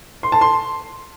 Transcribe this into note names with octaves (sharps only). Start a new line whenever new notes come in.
C6
A5
C6